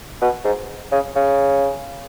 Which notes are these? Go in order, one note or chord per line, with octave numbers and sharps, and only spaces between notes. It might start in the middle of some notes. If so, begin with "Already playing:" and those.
B2
G#2
C#3
C#3